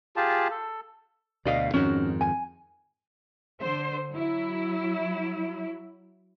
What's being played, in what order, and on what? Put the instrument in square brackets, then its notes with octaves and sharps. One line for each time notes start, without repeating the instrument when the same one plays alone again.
[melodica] F4 G4 G#4 A5
A4
[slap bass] D2 B2 [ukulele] D5 D#5 F5
[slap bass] F2 G#2 D#3 [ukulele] C#4 F#4
[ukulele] G#5
[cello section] D3 C5
F#3 E4